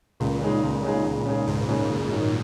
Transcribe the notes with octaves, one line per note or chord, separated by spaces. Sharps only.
C#2 A#2
C#3 G#3 D#4 G#4
C#2
C#3 G#3 D#4 G#4
C#2 A#2
C#3 G#3 D#4 G#4
C#2 G#2
C#3 G#3 D#4 G#4
F#1
F#2 D#3 F#3 D#4